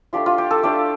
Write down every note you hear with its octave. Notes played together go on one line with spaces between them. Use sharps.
A3 D4 F4 G4
F4
G4
A4
A3 D4 F4 G4